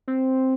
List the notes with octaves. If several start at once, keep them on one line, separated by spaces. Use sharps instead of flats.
C4